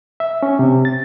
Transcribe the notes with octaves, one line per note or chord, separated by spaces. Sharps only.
E5
C#4
C3
A6